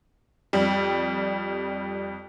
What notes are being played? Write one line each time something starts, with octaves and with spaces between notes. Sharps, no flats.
F2 G3